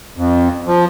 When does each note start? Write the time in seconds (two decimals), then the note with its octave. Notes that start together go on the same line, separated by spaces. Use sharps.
0.17 F2
0.67 F3